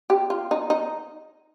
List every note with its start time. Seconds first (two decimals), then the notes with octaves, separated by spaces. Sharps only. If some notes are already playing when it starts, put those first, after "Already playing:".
0.10 G4
0.30 F4
0.51 D#4
0.70 D#4